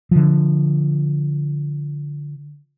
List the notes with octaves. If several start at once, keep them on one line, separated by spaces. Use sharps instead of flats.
D3 F3